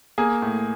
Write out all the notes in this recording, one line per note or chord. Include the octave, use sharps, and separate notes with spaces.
A#3 G#4
A2